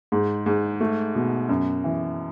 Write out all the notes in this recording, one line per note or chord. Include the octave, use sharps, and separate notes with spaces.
G#2
G#2
A3
B2
F#2
E3